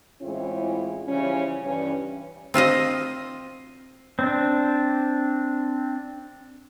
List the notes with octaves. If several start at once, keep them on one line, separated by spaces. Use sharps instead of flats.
A2 E3 G#3 C4 C#4 F4
C#3 E3 F3 G3 C#4
G2 E3 C#4
C4 F4 C5 D#5
C4 D4